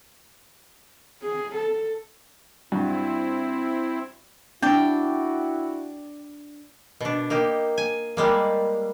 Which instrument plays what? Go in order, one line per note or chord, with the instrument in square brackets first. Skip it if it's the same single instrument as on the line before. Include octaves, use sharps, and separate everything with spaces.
[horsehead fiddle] G#4
A4
[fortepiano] G2 F#4 [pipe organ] C4 E4
[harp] D4 [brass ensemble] E4 F#4 [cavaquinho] D5 G5
[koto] B2 D4
A#3 D#4 G4
G#5
G3 G#3 A#3